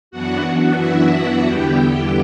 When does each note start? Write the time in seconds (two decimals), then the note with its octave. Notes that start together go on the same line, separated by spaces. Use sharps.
0.11 F#2 E3 B3 D4 F#4 F#5
0.78 E4 E5
1.46 E2 D3 G3 B3 E4 G4 G5